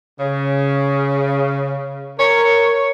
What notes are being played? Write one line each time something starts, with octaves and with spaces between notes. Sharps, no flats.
C#3
A#4 C#5